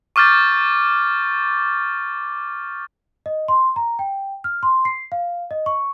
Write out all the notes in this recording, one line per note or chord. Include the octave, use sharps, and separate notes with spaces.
C#6 D6 F6 G6 A6
D#5
C6
A#5
G5
F6
C6
C7
F5
D#5
C#6